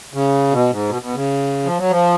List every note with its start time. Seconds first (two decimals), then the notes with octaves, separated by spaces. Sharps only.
0.14 C#3
0.51 B2
0.71 G#2
0.89 B2
1.02 B2
1.15 C#3
1.65 F3
1.78 F#3
1.90 F3